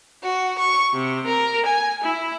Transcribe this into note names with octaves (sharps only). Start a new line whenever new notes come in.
F#4
C#6
C3
A#4
G#5
E4